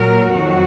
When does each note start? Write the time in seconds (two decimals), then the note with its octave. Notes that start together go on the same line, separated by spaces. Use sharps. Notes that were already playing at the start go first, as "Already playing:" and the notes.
Already playing: A#2 F#3 A#4
0.30 F2 D#3 F#3 F#4